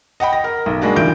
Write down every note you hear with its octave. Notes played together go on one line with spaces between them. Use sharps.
D#5 F#5 G5 B5
A#6
A#4
B1
G3 G#3 A#3 D4 F#4
A1 D2 D#3 F4 G6 D7